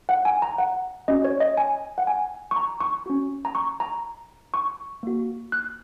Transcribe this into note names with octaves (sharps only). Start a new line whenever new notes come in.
F#5
G#5
A#5
F#5
C#4 F#4 D#5
C#5
D#5
G#5
F#5
G#5
C#6
A#5
C#6
C#4 F#4
A#5
C#6
A#5
C#6
A#3 F#4
F#6